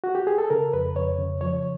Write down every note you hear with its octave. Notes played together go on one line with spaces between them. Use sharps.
F#4
G4
G#4
A4
C#3 A#4
F2 B4
F2 C#5
C#3
F3 C#5